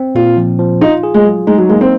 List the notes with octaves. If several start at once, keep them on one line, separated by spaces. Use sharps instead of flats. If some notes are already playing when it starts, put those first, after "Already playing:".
Already playing: C4
A#2 F4
F3
F3
D#4 F4
G#4
G#3
F#3
G#3 D#4
F#3
G#3 A#3
C4